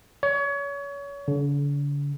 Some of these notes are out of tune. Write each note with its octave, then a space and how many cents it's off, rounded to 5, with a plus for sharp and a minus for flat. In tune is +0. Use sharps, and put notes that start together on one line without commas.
C#5 +30
D3 -45